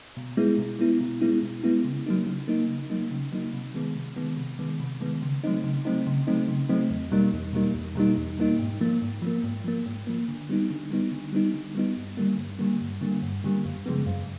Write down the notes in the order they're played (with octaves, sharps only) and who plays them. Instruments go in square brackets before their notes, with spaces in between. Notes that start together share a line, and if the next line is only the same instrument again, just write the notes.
[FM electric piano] B2
G#3 B3 E4
B2
G#3 B3 E4
B2
G#3 B3 E4
B2
G#3 B3 E4
C#3
F#3 A#3 D#4
C#3
F#3 A#3 D#4
C#3
F#3 A#3 D#4
C#3
F#3 A#3 D#4
C3
D#3 G#3 B3
C3
D#3 G#3 B3
C3
D#3 G#3 B3
C3
D#3 G#3 B3
C#3
F#3 A3 C4 D#4
C#3
F#3 A3 C4 D#4
C#3
F#3 A3 C4 D#4
C#3
F#3 A3 C4 D#4
E2
B2 G3 A#3 D#4
E2
B2 G3 A#3 D#4
E2
B2 G3 A#3 D#4
E2
B2 G3 A#3 D#4
G#2
F3 A#3
G#2
F3 A#3
G#2
F3 A#3
G#2
F3 A#3
D3
G3 B3 D#4
D3
G3 B3 D#4
D3
G3 B3 D#4
D3
G3 B3 D#4
G2
D3 G3 A#3
G2
D3 G3 A#3
G2
D3 G3 A#3
G2
D3 G3 A#3
F#2
C#3 F3 G#3 B3
F#2